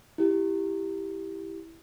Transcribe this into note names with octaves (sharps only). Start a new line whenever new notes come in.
E4 G4